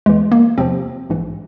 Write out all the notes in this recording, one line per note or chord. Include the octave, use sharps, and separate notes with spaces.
E2 E3 G#3
A#3
E2 C3 F3 C4
A#1 G#2 E3